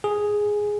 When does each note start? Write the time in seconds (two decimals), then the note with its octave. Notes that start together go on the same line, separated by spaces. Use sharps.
0.04 G#4